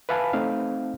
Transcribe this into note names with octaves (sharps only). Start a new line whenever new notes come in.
B4 E5 F5 G#5 A5 B5
A3 C4 D#4 F5